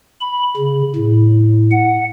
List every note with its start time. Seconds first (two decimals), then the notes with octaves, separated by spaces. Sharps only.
0.21 B5
0.57 C#3
0.96 A2
1.72 F#5